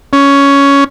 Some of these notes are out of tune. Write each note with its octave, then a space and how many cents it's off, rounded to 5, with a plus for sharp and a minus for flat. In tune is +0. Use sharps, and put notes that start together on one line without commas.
C#4 +10